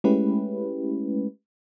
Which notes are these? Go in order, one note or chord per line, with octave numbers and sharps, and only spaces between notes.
G#3 A3 C#4 E4 G4 B4